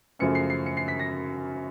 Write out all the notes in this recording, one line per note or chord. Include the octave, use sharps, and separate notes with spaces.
F#2 C#3 F3 A3 C#4 C#7
C7
C7
C#7
C7
B6
A#6